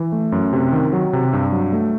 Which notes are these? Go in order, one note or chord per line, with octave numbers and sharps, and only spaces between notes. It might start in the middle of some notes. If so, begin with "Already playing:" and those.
Already playing: E3
A3
F#2
C3
D#3
F#3
C3
G2
F#3
A3